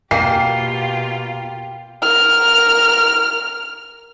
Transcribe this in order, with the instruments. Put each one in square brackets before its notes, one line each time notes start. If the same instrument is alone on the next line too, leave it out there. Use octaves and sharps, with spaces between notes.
[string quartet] B2 F4 G4 [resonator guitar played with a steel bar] A#3 [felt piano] G5 [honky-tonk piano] C7
[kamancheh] A#4 F6